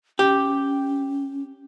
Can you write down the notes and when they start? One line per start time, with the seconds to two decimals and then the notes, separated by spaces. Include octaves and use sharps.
0.19 C#4 G4